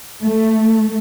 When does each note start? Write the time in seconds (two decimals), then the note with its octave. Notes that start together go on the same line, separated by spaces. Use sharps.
0.22 A3